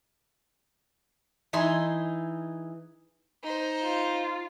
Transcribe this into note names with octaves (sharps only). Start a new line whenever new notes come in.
E3 D#4 G#4 E5 C6
D#4 C5
F4